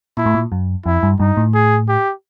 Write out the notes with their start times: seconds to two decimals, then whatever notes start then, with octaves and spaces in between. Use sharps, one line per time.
0.17 A#2 E4
0.26 A2
0.34 A#2
0.52 F#2
0.86 F2 E4
1.03 G2
1.20 G2 D#4
1.37 A2
1.55 G#4
1.88 G4